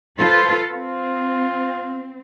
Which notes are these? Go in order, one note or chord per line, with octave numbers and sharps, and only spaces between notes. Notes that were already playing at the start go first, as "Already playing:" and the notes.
F4 A4 B4 C5
C4 F4